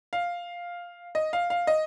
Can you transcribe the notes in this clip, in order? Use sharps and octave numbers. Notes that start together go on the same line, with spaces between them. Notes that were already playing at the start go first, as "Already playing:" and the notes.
F5
D#5
F5
F5
D#5